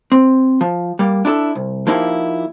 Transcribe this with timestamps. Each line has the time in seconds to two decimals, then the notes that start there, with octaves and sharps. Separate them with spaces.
0.12 C4
0.61 F3
0.99 G3 A#3
1.25 D4 E4 G4 A4
1.55 C2
1.87 F3 A#3 D#4 E4 G4